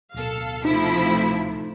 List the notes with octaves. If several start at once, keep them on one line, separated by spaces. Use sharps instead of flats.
D1 B2 A4 F5
C3 F3 A3 D#4 E4